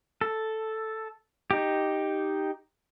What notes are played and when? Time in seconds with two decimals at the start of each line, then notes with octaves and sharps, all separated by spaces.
0.21 A4
1.51 D#4 G4